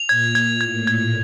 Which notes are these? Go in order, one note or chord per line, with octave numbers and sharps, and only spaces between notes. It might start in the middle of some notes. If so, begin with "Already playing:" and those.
Already playing: F7
A#2 G#6
G#6
A2 G#6
G#6